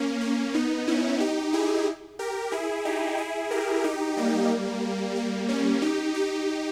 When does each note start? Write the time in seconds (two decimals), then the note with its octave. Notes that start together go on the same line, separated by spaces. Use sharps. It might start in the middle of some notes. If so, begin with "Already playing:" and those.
Already playing: A#3 C#4
0.21 A#3 C#4
0.54 B3 D#4
0.87 C#4 E4
1.20 D#4 G4
1.53 E4 G#4
2.19 G4 A#4
2.52 E4 G#4
2.85 D#4 G4
3.18 E4 G#4
3.51 G4 A#4
3.84 D#4 G4
4.17 G3 A#3
5.16 G3 A#3
5.48 A#3 C#4
5.82 D#4 G4
6.14 D#4 G4